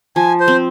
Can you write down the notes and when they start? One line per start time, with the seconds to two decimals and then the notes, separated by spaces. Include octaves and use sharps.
0.16 F3 G#5
0.40 C5
0.48 C4